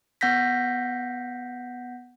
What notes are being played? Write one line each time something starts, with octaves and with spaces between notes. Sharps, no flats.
B3 F#5 G6 A#6 B6